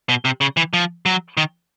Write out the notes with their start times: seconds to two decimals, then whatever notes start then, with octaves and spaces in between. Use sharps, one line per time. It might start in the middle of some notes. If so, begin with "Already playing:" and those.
0.09 B2
0.25 C3
0.41 C#3
0.57 E3
0.73 F3
1.06 F#3
1.37 D#3